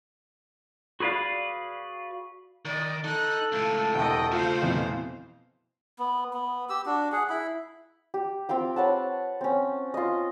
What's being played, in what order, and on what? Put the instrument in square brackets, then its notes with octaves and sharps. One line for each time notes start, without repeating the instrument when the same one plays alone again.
[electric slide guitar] F#4 G#4 B4 D5 F5
[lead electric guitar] D#3 [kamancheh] D5 D#5
[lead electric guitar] D#4 [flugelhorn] A4 [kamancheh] F#6
[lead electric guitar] C#2 A2 [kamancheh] F5
[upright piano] E1 C2 [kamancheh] F#4 D#5 [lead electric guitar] G5
[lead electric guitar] C#3 A3 [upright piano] F4 [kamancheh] C5 F5
[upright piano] F2 B2 E3
[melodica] B3
B3
G4 E6
D4 F#4
G#4 F#5
E4 B5
[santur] G4
C4 F4 F5 G5
B4 C#5 F#5 A5
C4 C#4
F4 D#5